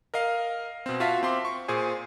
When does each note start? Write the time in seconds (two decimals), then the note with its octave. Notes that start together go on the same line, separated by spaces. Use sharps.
0.14 A#4 D#5 F5
0.86 B2 C4
1.00 F4 F#4 E5 F5 A5 B6
1.23 C4 C6 D6
1.45 C#6
1.68 A#2 G#4 C5 G#5